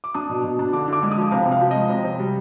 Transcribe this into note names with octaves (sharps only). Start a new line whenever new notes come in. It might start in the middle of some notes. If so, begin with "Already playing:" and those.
D6
D4 D#6
B2
B2
D4
D3 D6
D3 D6
G#3
D#6
F3
C3 F5
C3
F5
F3
G#3 D#5
C3
C3
G3